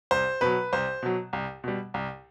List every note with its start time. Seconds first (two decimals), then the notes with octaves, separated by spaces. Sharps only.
0.11 C2 C5
0.41 B2 F#3 B4
0.73 C2 C5
1.03 B2 F#3
1.33 C2
1.64 B2 G3
1.94 C2